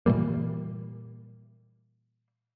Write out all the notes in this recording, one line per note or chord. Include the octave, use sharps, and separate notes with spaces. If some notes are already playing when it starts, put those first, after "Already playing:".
A#2 E3 G3 A#3